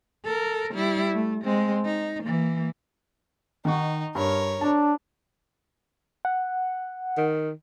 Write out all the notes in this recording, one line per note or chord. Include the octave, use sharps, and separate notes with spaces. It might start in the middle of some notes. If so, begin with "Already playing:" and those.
A4 A#4
G3 E4
A3
G#3 C4
D#4
E3 A#3
D#3 D#4 F#5 C#6
G2 A#4 C#5
D4 A5
F#5
D#3